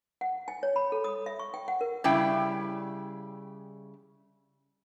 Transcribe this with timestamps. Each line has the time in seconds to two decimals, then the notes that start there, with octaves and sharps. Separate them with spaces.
0.21 F#5
0.48 G#5
0.63 C#5
0.76 B5
0.92 A4
1.04 D#6
1.26 E5
1.39 C#6
1.54 G5
1.68 F#5
1.81 A#4
2.04 C#3 G3 E4 G5